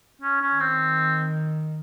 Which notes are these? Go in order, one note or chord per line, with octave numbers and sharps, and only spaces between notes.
C#4
C#4
D#3
C4